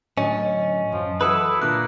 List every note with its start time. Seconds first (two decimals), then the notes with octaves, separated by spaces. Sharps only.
0.18 A2 D3 F#3 C#4 D#5
0.92 F#2 F3
1.21 E3 E4 F#4 A4 B4 D#6
1.62 A#2 D3 A#3 F4 F#6